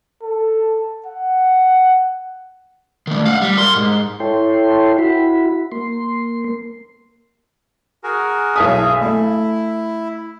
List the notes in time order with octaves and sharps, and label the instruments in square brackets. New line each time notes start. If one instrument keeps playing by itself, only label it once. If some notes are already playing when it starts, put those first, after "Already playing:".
[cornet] A4
F#5
[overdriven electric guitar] D#3 A3
F5 F#5
G3
A#4 C6
G#2
[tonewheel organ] E4 A4 C#5 G5 C6
E4 F#4 B5
A#3 C6
[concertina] F#4 G#4 A#4
[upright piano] B1 G#5 D#6 [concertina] G#4 E5
[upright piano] A3 [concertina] E4